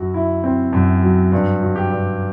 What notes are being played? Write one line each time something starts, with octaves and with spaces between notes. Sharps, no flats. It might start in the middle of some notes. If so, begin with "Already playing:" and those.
Already playing: F#2 F#3 F#4
E4
C4
F#2
F#3
G2
F#3
G4
G2